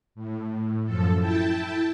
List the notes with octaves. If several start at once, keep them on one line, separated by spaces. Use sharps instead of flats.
A2
F#2 F3 A4
E4 G5 A5